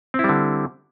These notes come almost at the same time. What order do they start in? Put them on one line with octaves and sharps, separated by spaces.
C4 E4 G3 D3